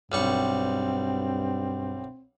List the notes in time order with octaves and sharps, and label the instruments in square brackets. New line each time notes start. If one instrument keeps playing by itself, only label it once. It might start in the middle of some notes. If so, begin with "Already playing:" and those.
[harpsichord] B1 G3 C#6 [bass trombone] G2 [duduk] C4